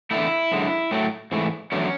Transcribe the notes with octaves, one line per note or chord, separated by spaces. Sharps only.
E2 D3 A3 E4
F#2 D3 G#3
A2 F#3 A3
G#2 E3 A3
E2 D3 F#3 A3 C#4